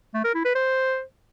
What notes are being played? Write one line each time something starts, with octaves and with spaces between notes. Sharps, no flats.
A3
A#4
E4
B4
C5